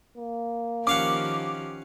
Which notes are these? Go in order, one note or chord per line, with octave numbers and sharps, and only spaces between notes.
A#3
D#3 F3 C#4 G4 F5 F#5 D6